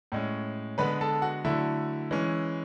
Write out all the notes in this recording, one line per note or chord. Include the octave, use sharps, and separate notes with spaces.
A2 G#3 C#4
D3 G#3 B3 B4 B5
A4 A5
F#4 F#5
D3 F#3 A3 E4 E5
E3 G#3 C#4